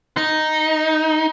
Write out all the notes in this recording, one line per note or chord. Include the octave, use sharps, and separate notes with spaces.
D#4